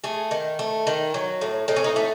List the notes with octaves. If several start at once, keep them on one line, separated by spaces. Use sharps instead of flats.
A3 G#4
D#3
A3
D#3
F#3
A2
A2 D#4
C#4
D#4
A3 C#4